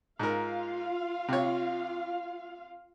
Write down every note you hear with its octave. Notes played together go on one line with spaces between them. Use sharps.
G#2 F4 A#4 F5
C3 C#5